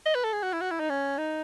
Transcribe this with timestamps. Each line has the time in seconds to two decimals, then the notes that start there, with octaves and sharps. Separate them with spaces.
0.06 D#5
0.15 B4
0.24 A4
0.33 G#4
0.43 F#4
0.53 E4
0.61 F#4
0.71 E4
0.80 D#4
0.90 C#4
1.18 D#4